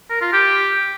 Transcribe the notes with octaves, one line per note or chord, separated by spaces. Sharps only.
A#4
F4
G4